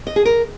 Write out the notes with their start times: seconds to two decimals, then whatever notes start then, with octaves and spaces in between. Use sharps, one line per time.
0.07 D#5
0.16 G#4
0.25 A#4